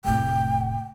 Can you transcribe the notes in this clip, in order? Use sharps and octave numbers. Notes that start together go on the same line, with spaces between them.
F1 A2 G5